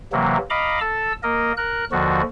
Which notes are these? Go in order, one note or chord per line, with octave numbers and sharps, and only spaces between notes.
C3 E3 F#3 A#3
D#5 F5 A#5 B5 D6
A4 A5 E6
A#3 A#4 D#5
A#4 F#6
D#2 D3 F3 F#4